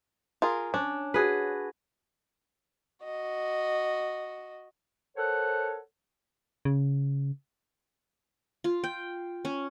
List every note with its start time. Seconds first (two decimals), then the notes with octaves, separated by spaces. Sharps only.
0.42 F4 G#4 A#4
0.74 C#4 D4
1.14 F#4 G#4 B4
3.05 F#4 D#5
5.16 A4 A#4 C5 C#5 F#5
6.65 C#3
8.64 F4
8.84 G5
9.45 C#4